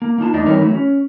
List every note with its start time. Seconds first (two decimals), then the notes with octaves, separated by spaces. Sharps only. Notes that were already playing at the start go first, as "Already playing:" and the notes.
0.02 A#3
0.18 A#3 D#4 F4 A5
0.33 E2 A3 D4 D#4 D5 D#5
0.46 E3 G3 C4 D#4 A#4 C#5
0.61 E3 F#3 A3
0.74 C#4